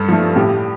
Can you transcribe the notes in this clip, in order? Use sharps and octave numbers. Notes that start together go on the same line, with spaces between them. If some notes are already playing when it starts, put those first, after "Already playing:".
Already playing: G2 A4
F3 A3
A2 G4